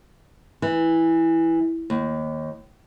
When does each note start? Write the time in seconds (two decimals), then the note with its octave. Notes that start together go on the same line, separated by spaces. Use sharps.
0.62 E3
1.90 D#2